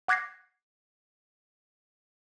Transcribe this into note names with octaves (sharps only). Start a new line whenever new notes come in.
F#5 D6 F#6 G#6 A#6 C7